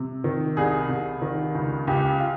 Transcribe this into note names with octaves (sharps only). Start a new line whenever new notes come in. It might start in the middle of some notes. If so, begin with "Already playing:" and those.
Already playing: C3
D#3
C2 G#4
C2
D#3
C#2
C#2 G4
F4